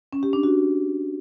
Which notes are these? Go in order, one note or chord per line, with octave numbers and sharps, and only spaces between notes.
C#4
G4
D4
F#4